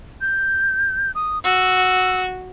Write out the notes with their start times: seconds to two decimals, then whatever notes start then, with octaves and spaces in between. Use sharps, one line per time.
0.21 G6
1.15 D#6
1.44 F#4 E6